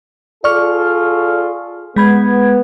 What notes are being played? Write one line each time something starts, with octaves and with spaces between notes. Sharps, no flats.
F4 G#4 A4 D5 C#6 F6
G#3 B3 B5 G#6